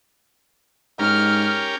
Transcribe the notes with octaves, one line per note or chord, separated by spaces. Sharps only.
G#2 C#4 G4 A#4 F6